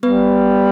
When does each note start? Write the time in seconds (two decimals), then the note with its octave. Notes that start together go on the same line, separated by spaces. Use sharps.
0.02 G3 B3 B4